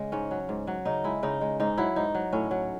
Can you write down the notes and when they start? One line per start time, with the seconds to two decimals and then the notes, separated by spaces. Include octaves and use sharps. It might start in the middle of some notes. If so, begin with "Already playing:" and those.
Already playing: C#3 G#3
0.12 G#2 C#4
0.31 F#3
0.49 G#2
0.67 F#3
0.85 C#3 D#4
1.04 G#3 E4
1.23 C#3 D#4
1.41 G#3
1.60 G#2 D#4
1.78 F#3 E4
1.96 G#2 D#4
2.15 F#3
2.32 A2 C#4
2.51 F#3